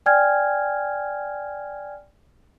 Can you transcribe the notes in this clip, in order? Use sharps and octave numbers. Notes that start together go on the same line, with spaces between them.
D5 G5 G#5 F6 G#6